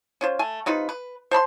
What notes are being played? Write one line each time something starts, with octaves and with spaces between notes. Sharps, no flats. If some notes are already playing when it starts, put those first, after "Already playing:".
C#4 F4 C5
A3 G#5
C3 D#4 F4 B4
B4
C5 A5 B5 C6